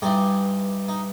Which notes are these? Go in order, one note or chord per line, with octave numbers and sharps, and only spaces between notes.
G2 E3 G3 D#4 G4
D#4